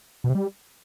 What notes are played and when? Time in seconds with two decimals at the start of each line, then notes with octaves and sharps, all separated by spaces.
0.24 B2
0.30 C3
0.35 G3